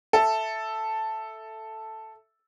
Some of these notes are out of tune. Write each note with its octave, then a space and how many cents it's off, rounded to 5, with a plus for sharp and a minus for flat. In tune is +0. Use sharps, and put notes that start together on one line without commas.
A4 +0 E5 +0